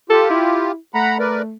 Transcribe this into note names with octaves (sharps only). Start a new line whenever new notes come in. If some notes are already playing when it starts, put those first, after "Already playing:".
F4 G4 A4
E4
A3 F#5 A#5 B5
A#4 B4 D5